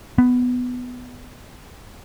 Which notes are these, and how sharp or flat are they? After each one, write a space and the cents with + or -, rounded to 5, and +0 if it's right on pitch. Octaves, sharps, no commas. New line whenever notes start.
B3 +10